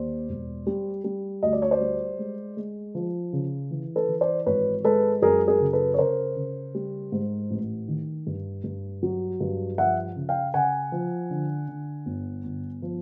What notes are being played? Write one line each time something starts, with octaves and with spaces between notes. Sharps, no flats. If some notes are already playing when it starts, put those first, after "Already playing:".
Already playing: D#2 C5 D5
E1
G3
G3
D2 D#5
D5
C#5
C5 D5
G3
G#3
G#3
F3
C#3
E3
A4 B4
E3
C5 D5
G#1 B4 C#5
G#3 A4 B4
F#2 G#4 A#4
G#4 A#4
C#3
A4 B4
C#5
C#3 A#4 C5
C#3
G3
G#2
A1
D#3
G2
G2
F#3
G2
F3 E5 F#5
C#3
F5 G5
C#3 F#5 G#5
F3
D3
D3
G1
G1
F3